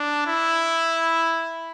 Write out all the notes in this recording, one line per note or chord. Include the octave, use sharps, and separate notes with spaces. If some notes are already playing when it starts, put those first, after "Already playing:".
Already playing: D4
E4